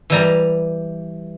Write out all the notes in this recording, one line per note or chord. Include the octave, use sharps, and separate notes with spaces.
E3 G3 A#5